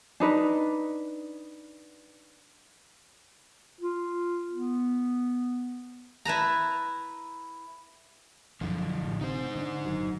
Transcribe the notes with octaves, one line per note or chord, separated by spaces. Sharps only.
D4 D#4 B4
F4
B3
E4 B4 A5 A#5
B1 F#2 D3 F3
A1
C3 D#4 C5
D3 A#3 D4
F#1 D#3 F#3